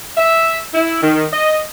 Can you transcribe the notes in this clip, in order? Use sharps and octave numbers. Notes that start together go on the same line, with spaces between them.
E5
E4
D#3
D#5